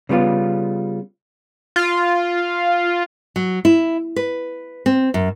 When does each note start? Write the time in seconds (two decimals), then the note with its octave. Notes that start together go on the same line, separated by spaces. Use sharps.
0.09 C#3 G3 B3 F4
1.76 F4
3.36 F#3
3.65 E4
4.16 B4
4.86 C4
5.14 F#2